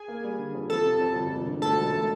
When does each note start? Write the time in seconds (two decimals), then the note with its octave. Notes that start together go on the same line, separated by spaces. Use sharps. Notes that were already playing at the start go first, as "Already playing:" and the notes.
Already playing: G#4 G#5
0.08 A#3
0.24 G3
0.39 D3
0.55 F2
0.70 F3 A4 A5
0.85 C3
1.01 F2
1.16 G1
1.32 E1
1.47 D3
1.62 D2 A4 A5
1.78 E1
1.92 A3